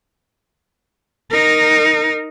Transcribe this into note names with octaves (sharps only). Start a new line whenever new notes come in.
D#4 A#4